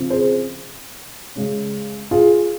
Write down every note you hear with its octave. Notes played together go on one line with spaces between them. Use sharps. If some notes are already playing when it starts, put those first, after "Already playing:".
Already playing: C#3 F3 C4
G#4 C5
C#3 G#3 C#4
F4 G#4